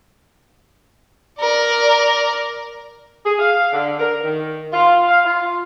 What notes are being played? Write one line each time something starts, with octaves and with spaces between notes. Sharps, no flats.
A#4 D5
G#4
F5
D3
A#4
D#3
F4
F5
F4